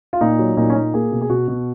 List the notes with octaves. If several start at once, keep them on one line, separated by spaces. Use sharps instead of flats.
F4
A#2 D#4
F#3
A#2 D#4
C#4
A#2 D#4
A#3 G#4
B2
G#4
B2 F#4
B2